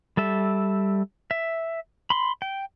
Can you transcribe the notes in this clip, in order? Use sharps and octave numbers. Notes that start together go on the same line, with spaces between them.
G3 A4 E5
E5
B5 C6
G5